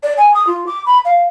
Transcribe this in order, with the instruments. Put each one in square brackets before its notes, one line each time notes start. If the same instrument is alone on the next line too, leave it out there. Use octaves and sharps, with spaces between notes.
[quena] D5
G#5
D#6
F4
D6
B5
F5